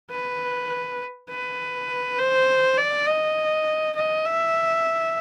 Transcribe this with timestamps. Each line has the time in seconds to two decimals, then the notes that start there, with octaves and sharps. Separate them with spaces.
0.11 B4
1.29 B4
2.18 C5
2.78 D5
3.07 D#5
3.96 D#5
4.26 E5